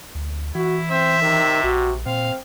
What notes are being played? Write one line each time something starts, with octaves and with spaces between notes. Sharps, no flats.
D2
E3 E4 F#4
C4 C5 E5
C3 D#3
A#1 F#4
A#2 C4 F5